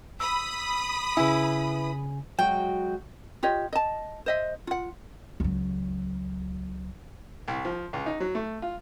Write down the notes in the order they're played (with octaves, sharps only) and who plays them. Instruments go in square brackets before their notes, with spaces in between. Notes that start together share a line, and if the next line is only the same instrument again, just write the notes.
[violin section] B5 D#6 [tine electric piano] E6
[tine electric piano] C#3 G#5 [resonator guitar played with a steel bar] E4 B4
[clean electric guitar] F#3 G#3 F#4 [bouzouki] G5
[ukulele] F4 G4 C#5 D#5
D#5 A5
C5 D#5 E5
F4 F#5
[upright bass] C#2 F#3
[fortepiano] C2
F3
C#2
D#4
F#3
A3
F4